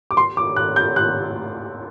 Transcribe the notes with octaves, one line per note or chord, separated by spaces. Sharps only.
D6
C6
D6
F#6
G6
F#6